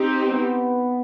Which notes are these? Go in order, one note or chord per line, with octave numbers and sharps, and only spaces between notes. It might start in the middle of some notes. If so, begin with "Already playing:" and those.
Already playing: C4 D#4 G4
B3